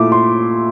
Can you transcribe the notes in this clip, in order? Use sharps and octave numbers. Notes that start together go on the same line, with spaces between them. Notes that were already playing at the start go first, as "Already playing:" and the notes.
Already playing: A#2 A3 E4 D6
C6